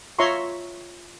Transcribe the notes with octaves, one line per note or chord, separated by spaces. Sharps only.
F4 C#5 E5 A#5 C6 C#6